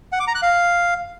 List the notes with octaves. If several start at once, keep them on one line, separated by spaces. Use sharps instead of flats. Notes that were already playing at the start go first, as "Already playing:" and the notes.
F#5
D6
A#5
F#6
F5